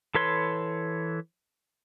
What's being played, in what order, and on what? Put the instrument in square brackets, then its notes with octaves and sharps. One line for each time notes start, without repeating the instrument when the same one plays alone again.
[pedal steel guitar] E3 A4 B4 C#5 C6